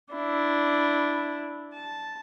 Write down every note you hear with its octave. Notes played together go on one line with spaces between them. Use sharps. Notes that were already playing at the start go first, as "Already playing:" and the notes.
D4 E4
A5